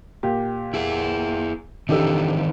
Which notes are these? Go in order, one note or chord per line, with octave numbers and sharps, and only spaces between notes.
A#2 G4
E4 G#4
D#3 E3 C4 D4 D#4 G4 A4